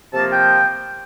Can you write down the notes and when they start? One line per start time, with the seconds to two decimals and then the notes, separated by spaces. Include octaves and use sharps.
0.13 C3 F3 A#3 A5
0.31 G5